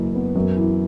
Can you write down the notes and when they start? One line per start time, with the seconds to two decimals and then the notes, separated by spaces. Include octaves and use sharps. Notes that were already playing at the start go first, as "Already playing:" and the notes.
Already playing: F#1 F#2 E3
0.15 B3
0.36 F#2
0.56 E3